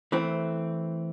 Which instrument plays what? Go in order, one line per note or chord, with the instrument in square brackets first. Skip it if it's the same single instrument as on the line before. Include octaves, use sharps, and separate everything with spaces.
[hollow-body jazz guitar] E3 A3 C4